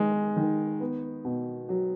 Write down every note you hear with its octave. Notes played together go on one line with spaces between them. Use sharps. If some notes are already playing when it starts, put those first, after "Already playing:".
Already playing: D#3 G#3
D#3
B3
B2
F#3